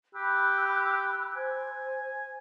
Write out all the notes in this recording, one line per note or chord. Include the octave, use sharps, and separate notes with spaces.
G4 B5 E6 F#6
C5 G#5